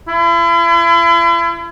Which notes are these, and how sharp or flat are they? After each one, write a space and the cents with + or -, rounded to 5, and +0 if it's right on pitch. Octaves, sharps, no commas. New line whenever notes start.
E4 +40